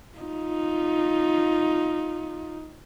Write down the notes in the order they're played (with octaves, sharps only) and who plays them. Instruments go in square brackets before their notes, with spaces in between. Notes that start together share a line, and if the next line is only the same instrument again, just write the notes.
[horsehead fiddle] D#4 F4